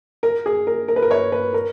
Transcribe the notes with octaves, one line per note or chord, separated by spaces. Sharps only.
A#4
G#4
A#4
A#4
B4
A#4
C#5
B4
A#4